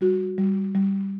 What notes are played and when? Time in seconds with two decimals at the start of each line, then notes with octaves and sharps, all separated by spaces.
0.01 G3 F#4
0.38 G3
0.75 G3